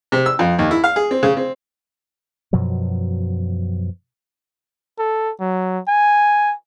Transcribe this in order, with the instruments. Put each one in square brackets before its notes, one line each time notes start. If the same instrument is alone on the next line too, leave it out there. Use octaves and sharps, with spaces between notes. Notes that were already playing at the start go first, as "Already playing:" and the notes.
[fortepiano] C3
E6
F2
D#2
E4
F5
G#4
C4
C#3
C4
[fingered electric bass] F#2 B2 F3 F#3
[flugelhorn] A4
F#3
G#5